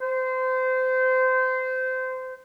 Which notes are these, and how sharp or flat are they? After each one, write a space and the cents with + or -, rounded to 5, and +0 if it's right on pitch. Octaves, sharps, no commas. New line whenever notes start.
C5 -25